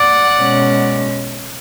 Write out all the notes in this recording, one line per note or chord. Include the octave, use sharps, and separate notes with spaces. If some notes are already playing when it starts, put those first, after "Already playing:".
Already playing: D5 F#5
B2 G#3 C#4